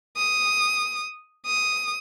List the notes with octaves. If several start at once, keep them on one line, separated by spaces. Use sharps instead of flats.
D#6
D#6